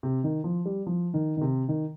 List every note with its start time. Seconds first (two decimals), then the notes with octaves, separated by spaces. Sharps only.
0.03 C3
0.24 D#3
0.44 F3
0.65 G3
0.87 F3
1.14 D#3
1.37 D#3
1.41 C3
1.69 D#3